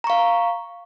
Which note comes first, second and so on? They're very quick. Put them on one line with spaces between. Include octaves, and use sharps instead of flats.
A#5 C#6 F5